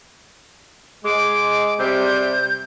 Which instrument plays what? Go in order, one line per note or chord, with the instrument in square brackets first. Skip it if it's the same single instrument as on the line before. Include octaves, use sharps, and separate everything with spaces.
[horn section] G#3 [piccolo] D6
[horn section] C3 G3 [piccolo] G6